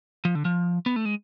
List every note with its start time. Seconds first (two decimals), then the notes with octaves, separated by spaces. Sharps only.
0.25 F3
0.35 D3
0.45 F3
0.86 B3
0.96 A3
1.05 G#3